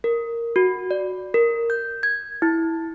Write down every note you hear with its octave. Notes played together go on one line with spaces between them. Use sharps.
A#4
F#4
D5
A#4
G6
G#6
E4